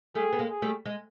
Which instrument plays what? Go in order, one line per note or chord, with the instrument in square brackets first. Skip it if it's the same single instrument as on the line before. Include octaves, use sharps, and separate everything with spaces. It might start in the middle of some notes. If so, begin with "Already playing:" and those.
[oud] G3 A3 [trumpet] G#4
[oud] B3
G#3 A#3
[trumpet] G#4
[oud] G3 A3
G#3